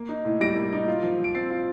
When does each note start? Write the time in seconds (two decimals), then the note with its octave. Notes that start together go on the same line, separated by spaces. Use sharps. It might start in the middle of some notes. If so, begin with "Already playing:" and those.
Already playing: A#3 A#6 D7
0.09 D#4
0.25 A2
0.40 G3 A#6 D7
0.56 A#3
0.72 D#4
0.88 F4
1.03 F3
1.19 F3
1.24 D7
1.35 C4 A6 C7
1.50 F4